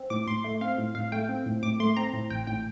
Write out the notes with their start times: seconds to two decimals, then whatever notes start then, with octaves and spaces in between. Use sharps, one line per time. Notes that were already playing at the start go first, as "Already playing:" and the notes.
Already playing: C4
0.10 A2 D6
0.27 A2 C6
0.44 A3
0.61 C4 F5
0.78 A2
0.95 A2 F5
1.12 A3 G5
1.29 C4
1.46 A2
1.63 A2 D6
1.80 A3 C6
1.97 C4 A#5
2.14 A2
2.30 A1 G5
2.47 A2 G5